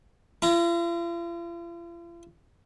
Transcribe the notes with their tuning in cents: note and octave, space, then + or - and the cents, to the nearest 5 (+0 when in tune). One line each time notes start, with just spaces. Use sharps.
F4 -45 A#5 +0